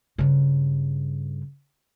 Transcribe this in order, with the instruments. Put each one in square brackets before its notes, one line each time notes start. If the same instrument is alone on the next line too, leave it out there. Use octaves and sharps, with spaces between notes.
[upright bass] G2 C#3